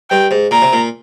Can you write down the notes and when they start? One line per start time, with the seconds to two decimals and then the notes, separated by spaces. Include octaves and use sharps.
0.10 G2 G5
0.31 G#2
0.51 A#2 A#5
0.62 C3
0.73 A#2